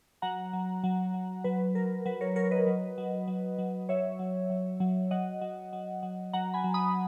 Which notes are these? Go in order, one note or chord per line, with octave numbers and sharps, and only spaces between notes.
F#3 F#5 A#5
F#3
F#3
F#3
F#3 B4
F#3 A#4
F#3 B4
A#4 C#5
F#3 A#4 C#5
B4 D#5
F#3
F#3
F#3
F#3
F#3 C#5 E5
F#3
F#3
F#3
F#3 D#5 F#5
F#3
F#3
F#3
F#3 F#5 A#5
G#5 B5
F#3
B5 D#6